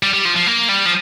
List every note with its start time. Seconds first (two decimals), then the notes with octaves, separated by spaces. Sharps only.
0.03 G3
0.13 G3
0.25 F3
0.36 F3
0.46 A#3
0.68 G3
0.86 F3